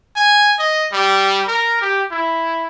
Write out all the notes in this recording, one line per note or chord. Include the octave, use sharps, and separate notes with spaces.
G#5
D#5
G3
A#4
G4
E4